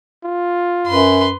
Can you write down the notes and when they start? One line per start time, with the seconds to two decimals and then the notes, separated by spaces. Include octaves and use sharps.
0.24 F4
0.87 F#2 B4 C6